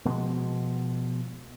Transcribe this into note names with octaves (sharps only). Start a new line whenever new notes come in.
B2 F3 G#3